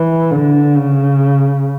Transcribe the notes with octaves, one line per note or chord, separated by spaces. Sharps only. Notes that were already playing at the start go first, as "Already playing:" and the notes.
Already playing: E3
D3
C#3